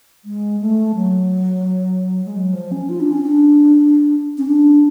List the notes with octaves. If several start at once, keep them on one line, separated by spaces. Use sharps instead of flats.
G#3
A3
F#3
G#3
F#3
F3
C#4
F4
D4
C#4
D4
C#4
D4